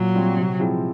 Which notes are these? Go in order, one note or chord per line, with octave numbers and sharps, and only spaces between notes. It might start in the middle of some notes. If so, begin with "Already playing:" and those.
Already playing: A#2 F#3
G3 C4 F4
C3
F3 G#3 C4 E4